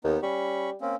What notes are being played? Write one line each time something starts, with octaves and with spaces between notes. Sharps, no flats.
D#2 B3 D#4
G3 C#4 B5 C#6
A#3 C4 C#4